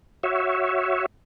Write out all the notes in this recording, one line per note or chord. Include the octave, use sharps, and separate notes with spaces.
F#4 C#5 E5